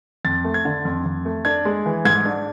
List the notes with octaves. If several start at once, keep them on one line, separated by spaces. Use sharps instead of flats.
F2 A6
A3
G#6
D3
F2
F2
A3
D4 G#6
G#3
E3
G#2 G#6
D4